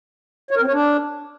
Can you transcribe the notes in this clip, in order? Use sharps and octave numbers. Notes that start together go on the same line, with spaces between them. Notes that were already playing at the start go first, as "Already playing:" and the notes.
C#5
A#4
C4
C#5
D4